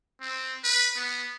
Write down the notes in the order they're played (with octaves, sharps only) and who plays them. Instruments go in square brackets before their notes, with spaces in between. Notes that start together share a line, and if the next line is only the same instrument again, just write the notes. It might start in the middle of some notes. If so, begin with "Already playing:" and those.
[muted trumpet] C4
B4
B3